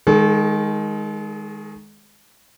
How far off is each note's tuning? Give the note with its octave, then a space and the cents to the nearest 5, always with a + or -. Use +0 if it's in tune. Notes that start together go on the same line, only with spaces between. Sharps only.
D#3 +5 G#3 +0 A4 -45